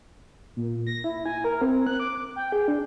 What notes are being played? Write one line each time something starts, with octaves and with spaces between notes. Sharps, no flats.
A#2
A#6
E4
G#5
A#4
C4
F#6
D6
G5
G#4
D4